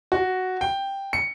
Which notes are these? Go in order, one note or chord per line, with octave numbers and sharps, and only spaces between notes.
F#4
G5
C#7